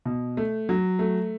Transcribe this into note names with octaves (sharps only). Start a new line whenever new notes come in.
B2
A3
F#3
A3